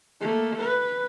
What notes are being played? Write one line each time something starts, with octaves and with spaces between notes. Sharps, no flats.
A3 A#3
B4